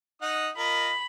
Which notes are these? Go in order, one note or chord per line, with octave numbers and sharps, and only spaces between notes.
D#4 F#5 D#6
F4 A#4 D#5 B5